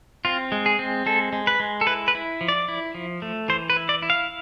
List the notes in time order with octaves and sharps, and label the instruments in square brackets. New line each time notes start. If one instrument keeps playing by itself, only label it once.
[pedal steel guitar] C4 F4
G#3
G#4
C4
G#3 A4
G#3
B4
G#3
A4
E4 B4
B4
E4
F3
D5
E4
F3
A3
E3 C5
B4
E4
D5
E4
F5